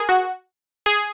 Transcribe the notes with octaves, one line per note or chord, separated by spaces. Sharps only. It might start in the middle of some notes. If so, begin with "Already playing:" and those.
Already playing: G#4 A#4
F#4
G#4